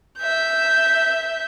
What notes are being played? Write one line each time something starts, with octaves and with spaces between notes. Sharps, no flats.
E5 G6